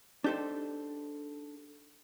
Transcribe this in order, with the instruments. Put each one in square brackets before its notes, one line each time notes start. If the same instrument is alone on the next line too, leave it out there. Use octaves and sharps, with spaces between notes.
[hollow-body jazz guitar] D4 D#4 G4 A4 C5